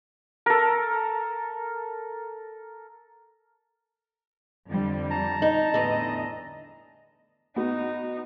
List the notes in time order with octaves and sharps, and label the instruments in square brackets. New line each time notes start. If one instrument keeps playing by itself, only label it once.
[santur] A4 A#4
[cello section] F2 D3 G3
[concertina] A5 A#5
[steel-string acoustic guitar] D#4
[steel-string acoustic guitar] E2 D3 [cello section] A2 D#5
[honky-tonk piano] B3 F#4 [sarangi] D#4